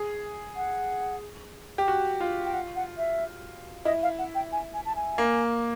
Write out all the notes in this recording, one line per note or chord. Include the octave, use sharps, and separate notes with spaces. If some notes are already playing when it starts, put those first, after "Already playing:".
Already playing: G#4
F#5
G4
F#4
F4
G5
F#5
F#5
E5
E4 D#5
F5
F#5
G5
G#5
G#5
A5
G#5
A#3